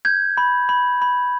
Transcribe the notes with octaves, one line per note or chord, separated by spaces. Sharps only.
G6 G#6
B5
B5
B5